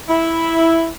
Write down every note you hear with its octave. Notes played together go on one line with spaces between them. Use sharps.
E4